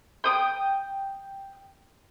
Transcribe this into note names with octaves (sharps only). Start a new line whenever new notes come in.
G5 D#6